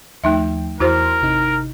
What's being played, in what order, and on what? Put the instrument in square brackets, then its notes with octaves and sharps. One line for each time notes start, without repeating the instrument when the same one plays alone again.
[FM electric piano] D#2 F3 G5 [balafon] A3 D#4 E5
[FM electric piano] E2 C6 [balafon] E4 F#4 C5 [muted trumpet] A#4
[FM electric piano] G#1 C3 D#4